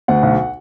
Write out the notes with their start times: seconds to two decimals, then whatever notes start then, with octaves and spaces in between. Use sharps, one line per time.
0.08 D2 F#5
0.23 B1